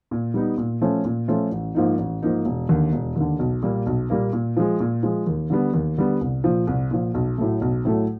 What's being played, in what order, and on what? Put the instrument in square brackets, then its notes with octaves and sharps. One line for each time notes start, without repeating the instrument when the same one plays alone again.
[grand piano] A#2
G3 B3 D#4
A#2
F3 A3 C#4 F4
A#2
F3 A3 C#4 F4
A1
G#2 F3 A#3 D#4
A1
G#2 F3 A#3 D#4
E1
D#2 D3
E1
D#2 D3
B1
A#2 G3 A#3
B1
A#2 G3 A#3
A#2
F3 G#3
A#2
F3 G#3
D#2
D3 G3 B3
D#2
D3 G3 B3
C2
A#2 F3
C2
A#2 F3
B1
A2 F#3 A3
B1
A2 F#3 A3